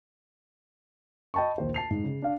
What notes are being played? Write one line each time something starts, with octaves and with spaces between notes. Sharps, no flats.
D#5 G5 A5 B5 C#6
A#1 D#2 C5
A5 C7 F7
G#2
C#3
D4 F5